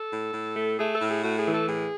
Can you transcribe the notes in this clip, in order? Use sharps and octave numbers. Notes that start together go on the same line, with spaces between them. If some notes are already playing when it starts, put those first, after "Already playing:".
Already playing: A4
A2
A2
A3
A3 G#4
A4
A2
G#4
A3 F#4
G#4
E3
A4
A2 G#4